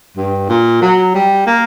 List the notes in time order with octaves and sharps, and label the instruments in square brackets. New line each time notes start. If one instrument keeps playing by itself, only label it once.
[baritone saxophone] G2
A#2
F#3
G3
A#3